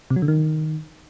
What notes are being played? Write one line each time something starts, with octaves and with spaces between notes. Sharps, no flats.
C3
F#3
D3
D#3